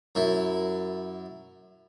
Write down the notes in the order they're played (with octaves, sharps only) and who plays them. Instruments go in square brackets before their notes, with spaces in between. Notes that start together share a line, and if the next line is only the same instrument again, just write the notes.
[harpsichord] F#2 E4